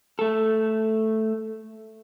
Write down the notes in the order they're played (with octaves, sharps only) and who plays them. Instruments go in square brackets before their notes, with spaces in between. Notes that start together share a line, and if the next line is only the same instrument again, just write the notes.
[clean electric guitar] A3 A4